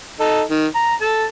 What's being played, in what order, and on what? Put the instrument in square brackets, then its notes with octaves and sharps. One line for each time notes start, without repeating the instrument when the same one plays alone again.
[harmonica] D#4 A4
D#3
A#5
A4 A5